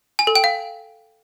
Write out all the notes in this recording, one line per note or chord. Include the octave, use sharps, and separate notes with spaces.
G#5
A4
G5
F5